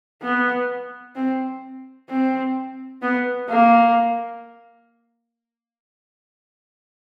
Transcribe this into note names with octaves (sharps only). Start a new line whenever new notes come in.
B3
C4
C4
B3
A#3